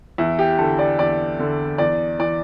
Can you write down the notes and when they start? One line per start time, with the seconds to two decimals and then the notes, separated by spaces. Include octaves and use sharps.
0.18 E2 E4
0.39 G4
0.58 D3 A4
0.79 D5
0.98 E2 D5
1.39 D3
1.78 E2 D5
2.19 E3 D5